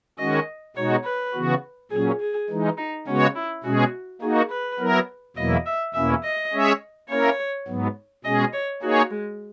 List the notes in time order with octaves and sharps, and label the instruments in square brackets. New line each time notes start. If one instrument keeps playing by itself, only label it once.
[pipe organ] D#3 G#3 C#4 F#4 [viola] D#5
[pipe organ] B2 G#3 D#4 F#4 [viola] C#5
[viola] B4
[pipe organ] C#3 E3 B3 F#4
[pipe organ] A#2 F#3 C#4 [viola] G#4
[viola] G#4
[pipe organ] E3 G#3 D#4
[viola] D#4
[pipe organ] C#3 G#3 B3 F#4 C#5 [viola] C#4
[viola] E4
[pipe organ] B2 G#3 C#4 G#4 [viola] F#4
[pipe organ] A#3 D#4 F#4 [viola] G#4
[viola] B4
[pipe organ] F#3 B3 E4 A#4
[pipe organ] E2 B2 F#3 A#3 E4 [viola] D#5
[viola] E5
[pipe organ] E2 B2 A#3 C#4 E4 [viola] E5
[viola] D#5
[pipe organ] G#3 C#4 G#4 C#5 E5
[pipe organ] A#3 C#4 E4 A#4 [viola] C#5
[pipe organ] G#2 F#3 B3
[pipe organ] B2 G#3 C#4 G#4 [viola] D#5
[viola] C#5
[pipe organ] A#3 D#4 G#4 C#5 [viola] F#4
[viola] G#3